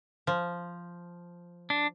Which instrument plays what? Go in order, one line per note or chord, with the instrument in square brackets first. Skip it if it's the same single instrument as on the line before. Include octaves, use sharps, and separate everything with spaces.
[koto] F3
[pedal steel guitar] D4